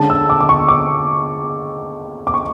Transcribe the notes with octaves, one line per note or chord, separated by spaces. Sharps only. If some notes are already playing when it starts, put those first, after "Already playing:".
Already playing: D3 G#3 C#4 A5
E6
D6
D6
C#6
D6
D6
C#6